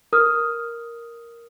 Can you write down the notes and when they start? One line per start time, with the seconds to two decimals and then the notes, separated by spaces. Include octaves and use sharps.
0.13 A#4 D#6 F6